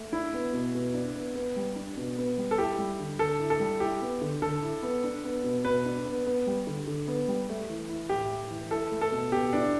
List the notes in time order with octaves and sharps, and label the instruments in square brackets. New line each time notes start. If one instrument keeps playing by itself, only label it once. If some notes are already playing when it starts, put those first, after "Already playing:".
Already playing: [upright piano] A3
[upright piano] D4 [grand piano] E4
[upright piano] B3
B2
B2
D4
B3
B3
G3
D4
B2
B3
G3
[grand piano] A4
[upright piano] E4 [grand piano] G4
[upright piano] G3
D3
[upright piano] D3 [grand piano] A4
[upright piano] E4
[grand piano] A4
[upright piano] G3
[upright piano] E4 [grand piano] G4
[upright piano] B3
D3
[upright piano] D3 [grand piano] A4
[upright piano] E4
B3
D4
B3
B2
[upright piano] B2 [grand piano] B4
[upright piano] D4
B3
B3
G3
D3
D3
B3
G3
A3
E3
E4
[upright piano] A2 [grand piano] G4
[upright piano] A3
E3
[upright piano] E4 [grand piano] A4
[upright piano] A3
[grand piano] A4
[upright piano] B2
[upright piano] B2 [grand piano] G4
[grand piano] D4 [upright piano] E4